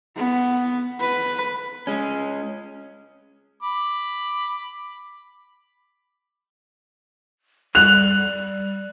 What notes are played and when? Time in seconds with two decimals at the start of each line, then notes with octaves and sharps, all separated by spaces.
0.16 B3
1.00 B4
1.87 G#3 C#4
3.63 B5 D6
7.75 G3 F#6 F7